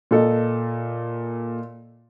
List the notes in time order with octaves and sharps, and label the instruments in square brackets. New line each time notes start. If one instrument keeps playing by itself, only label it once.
[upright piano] A#2 A4 D#5